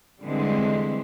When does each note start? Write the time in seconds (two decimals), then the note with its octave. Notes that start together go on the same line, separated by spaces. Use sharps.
0.24 D3 E3 G3 G#3 C4